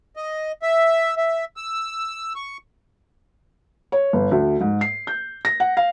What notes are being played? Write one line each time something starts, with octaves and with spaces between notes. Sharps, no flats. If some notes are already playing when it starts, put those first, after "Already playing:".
D#5
E5
E5
E6
C#6
C#5
G1
D2
G#2
C7
G6
A#6
F#5
F5